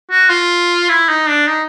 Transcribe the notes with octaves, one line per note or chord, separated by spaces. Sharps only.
F#4
F4
E4
D#4
D4
D#4